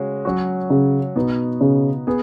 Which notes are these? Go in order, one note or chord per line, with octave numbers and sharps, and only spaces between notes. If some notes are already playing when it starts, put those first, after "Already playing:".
Already playing: C#3 G#3 C#4 F#4
F#3 C#4 F#4
C#3
B2 B3 D#4 F#4
C#3
B3 G#4